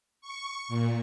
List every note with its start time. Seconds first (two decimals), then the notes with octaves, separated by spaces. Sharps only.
0.21 C#6
0.68 A#2